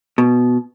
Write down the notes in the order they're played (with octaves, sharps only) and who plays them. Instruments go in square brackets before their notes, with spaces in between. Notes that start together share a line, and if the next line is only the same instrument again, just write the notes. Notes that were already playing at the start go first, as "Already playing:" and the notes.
[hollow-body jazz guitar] B2